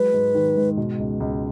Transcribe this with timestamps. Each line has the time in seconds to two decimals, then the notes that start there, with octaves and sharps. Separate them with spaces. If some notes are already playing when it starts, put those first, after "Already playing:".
Already playing: F#3 G#3 B4
0.14 G#2
0.35 D#3
0.57 G#2
0.77 B2
0.99 C#2
1.20 C#2